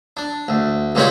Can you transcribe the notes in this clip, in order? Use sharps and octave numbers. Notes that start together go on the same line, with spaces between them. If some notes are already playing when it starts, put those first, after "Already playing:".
D4
D2
C#2 A#2 G#3 C#4 G4 C#5